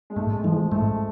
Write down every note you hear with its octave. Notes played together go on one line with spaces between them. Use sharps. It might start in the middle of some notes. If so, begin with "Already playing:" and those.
G#3
G#2 A3
G#3
E3 F3 G#3
G#3
G#2 A3